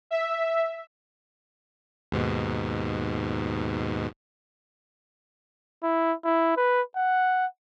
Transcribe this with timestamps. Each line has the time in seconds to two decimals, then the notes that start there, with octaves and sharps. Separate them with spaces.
0.11 E5
2.12 D#2 G#2 B2
5.83 E4
6.25 E4
6.57 B4
6.96 F#5